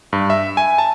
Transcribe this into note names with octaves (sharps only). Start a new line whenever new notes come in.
G2
E5
G#5
A5